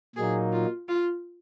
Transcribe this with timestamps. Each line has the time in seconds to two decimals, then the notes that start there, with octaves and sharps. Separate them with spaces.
0.16 A#2 F#3 A#3 D#4 G#4
0.52 F4
0.89 F4